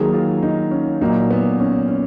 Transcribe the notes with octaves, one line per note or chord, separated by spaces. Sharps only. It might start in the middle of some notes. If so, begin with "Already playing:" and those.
Already playing: D#3 F#3 A#3 G#4
F4
D#4
C#4
A#2 F#3 A#3 D#4
B3
C#4
C#4